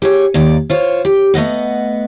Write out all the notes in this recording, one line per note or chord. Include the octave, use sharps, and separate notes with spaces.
G4 G#4 C#5
D#2 D#4 D5
F4 C5 C#5
G4
A3 B3 D#5 F#5